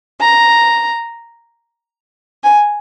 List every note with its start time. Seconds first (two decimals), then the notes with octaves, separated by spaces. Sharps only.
0.20 A#5
2.44 G#5